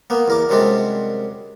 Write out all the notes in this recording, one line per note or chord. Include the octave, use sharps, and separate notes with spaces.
A#3 B3
E2 A#4 D6
F#2 C3 G3 G#3 C4 D4